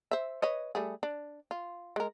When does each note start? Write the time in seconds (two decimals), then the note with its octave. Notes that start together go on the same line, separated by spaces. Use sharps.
0.11 C5 E5
0.42 B4 C#5 D#5
0.75 G3 A3 G#4
1.03 D4
1.51 F4
1.96 G#3 A#4